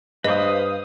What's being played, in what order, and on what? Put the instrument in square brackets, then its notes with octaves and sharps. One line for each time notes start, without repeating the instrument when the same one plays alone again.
[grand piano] G2 [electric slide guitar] B4 C5 [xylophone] D#5 [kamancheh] F5 D#6